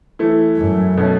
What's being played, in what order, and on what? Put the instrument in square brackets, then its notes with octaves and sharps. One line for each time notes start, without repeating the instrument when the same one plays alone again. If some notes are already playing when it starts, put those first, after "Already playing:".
[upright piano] E3 A3 E4
[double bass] F#2
[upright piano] B2 A3 C#4